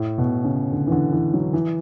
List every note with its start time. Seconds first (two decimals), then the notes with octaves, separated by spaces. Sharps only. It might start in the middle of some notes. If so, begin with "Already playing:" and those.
Already playing: A2
0.18 B2
0.44 C#3
0.72 D3
0.87 E3
0.92 D3
1.12 E3
1.34 F#3
1.53 E3